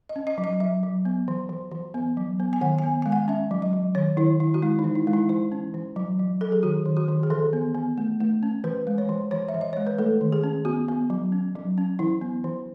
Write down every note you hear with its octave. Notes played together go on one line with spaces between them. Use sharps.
D#5
C#4
D#5
F#3
D#5
F#3 E5
F#3
B3
E3
E3
E3
B3
F#3
B3
G#5
D#3 F#5
G#5
B3
G#3 G#5
F#5
C#4 E5
F#3
D#5
F#3
D#3 C#5
D#3 E4
D#3 E4
F#4
G#3 E4
D#4
E3
E4
G#3
E4
E3 E4
C#4
E3
F#3
F#3
F#3 A4
G#4
D#3 F#4
D#3
F#4
D#3
G#4
E3 A4
B3
B3
A3
A3
C#4
E3 B4
G#3
C#5
E3
E3 C#5
E5
E3
D#5
G#3 C#5
B4
A3 A4
D#3
G#4
C#4
B3 F#4
B3
F#3
C#4
F#3
C#4
E3 E4
B3
E3